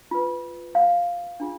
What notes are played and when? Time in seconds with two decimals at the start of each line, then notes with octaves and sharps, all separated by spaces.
0.11 F4 B4
0.75 F5
1.40 D4 F4 G#4